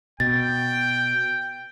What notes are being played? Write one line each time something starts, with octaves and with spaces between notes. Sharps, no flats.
B2 G5 A6